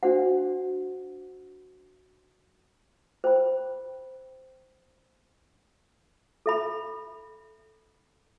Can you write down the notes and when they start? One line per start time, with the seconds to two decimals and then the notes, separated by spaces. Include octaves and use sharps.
0.03 D4 F#4 C5 F#5
3.24 C5 G5 B5
6.46 A4 E5 B5